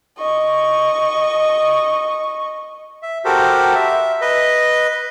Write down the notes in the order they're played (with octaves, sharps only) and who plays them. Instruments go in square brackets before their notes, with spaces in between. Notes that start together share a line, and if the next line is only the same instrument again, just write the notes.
[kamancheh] D#5 C#6
[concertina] E5
F#4 G4 A4 A#4 C5
E5
B4 D#5